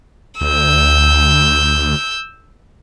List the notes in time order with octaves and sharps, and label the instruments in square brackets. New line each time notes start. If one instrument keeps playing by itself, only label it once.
[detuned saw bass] D2 [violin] E6 G6